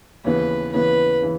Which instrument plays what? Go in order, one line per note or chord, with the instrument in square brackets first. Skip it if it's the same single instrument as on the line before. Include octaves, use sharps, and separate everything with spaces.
[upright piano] D#2 C#3 E3 B3 [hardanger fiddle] B4
[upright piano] D#2 C#3 E3 B3 [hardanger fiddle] B4
[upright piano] C#3 E3